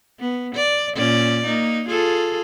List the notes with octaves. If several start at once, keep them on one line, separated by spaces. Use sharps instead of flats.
B3
D5
A#2 C#4 D5
A#3 D#4
F4 G#4 A4